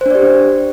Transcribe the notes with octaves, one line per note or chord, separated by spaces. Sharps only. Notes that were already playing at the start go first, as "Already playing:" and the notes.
D4 G4 C5 D5